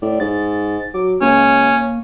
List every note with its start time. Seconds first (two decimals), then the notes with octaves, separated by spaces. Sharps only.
0.02 A2 D5
0.20 G#2 A6
0.94 F#3 D6
1.21 C#2 A#3 C#4